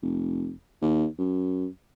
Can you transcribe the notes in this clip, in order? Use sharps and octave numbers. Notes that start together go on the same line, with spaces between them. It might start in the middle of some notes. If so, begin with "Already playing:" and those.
F1
D#2
F#2